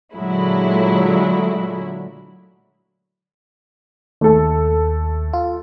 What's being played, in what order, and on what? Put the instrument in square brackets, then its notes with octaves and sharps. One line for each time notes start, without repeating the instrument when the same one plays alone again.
[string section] A#2 D3 F#3 G#3 A3 E4
[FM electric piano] D#2 [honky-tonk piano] A3 A4
[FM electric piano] F4